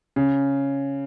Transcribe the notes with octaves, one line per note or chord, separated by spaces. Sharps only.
C#3